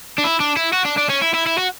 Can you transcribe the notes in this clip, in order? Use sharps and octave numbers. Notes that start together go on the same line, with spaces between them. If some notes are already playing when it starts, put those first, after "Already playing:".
D4
E4
D4
E4
F#4
D4
D4
C#4
E4
E4
E4
F#4